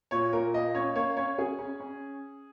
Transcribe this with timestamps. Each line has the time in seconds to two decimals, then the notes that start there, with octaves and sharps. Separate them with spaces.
0.11 A#2 C#5
0.33 A#2 A#4
0.54 A#3 D#5
0.74 C#4 C#5
0.95 A#3 C#5
1.17 C#4 C#5
1.38 C#4 G#4
1.59 C#4
1.80 C#4